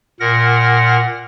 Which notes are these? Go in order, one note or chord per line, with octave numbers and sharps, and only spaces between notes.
A#2 A#4 F#5 A#6